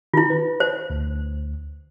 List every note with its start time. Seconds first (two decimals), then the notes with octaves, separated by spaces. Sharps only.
0.14 D#3 E4 F4
0.30 B4
0.60 C5
0.90 D2